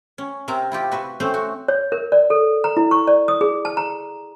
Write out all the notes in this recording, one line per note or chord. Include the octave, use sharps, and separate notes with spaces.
C#4
C3 C4 A#4 E5 A#5
E4 F4 G4
F#4 B4 E5
A3 C4 C#4 C5 G5
F#4
C#5
A#4
D5
A4
A#5
E4
C#6
D5
D#6
G#4
A5
A#5